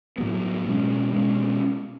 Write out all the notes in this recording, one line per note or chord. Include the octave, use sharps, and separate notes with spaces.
A2 F#3 B3
B2 G#3 C#4
B2 G#3 C#4